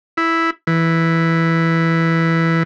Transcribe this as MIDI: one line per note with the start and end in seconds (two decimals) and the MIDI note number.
0.17 0.50 64
0.67 2.63 52